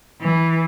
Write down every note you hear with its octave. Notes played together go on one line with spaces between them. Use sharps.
E3